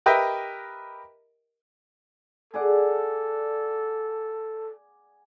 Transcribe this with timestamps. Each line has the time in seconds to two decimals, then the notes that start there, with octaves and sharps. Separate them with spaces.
0.06 G4 A#4 B4 D#5 E5 G5
2.54 G#4 A4 D5 F#5